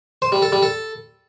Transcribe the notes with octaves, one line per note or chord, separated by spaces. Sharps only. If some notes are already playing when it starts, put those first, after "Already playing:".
C5
G3
A4
G3
A4